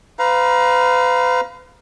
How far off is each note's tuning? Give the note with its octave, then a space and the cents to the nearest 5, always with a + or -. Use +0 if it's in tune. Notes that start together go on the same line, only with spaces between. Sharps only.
B4 +45 F5 +0 A#5 +30